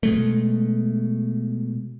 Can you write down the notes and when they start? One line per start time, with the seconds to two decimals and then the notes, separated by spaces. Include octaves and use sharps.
0.03 B2 G#3 A3